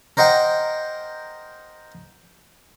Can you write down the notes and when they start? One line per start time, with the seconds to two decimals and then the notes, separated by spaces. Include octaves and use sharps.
0.17 A#4 C5 D#5 F#5 G5